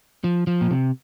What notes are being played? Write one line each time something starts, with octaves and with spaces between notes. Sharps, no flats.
F3
F3
A#2
C3